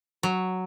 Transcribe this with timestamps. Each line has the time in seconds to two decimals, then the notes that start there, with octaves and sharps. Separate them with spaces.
0.23 F#3